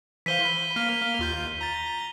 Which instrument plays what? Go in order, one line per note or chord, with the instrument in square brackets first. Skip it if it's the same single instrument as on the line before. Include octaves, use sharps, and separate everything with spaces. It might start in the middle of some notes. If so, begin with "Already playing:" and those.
[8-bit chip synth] E3 C5 F5 [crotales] B6 D#7 G7
[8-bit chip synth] B5
A#3 F5 F6
D#2 F4 G6
A#5 A6